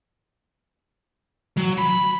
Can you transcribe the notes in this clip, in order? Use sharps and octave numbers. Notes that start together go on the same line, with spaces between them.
F#3
B5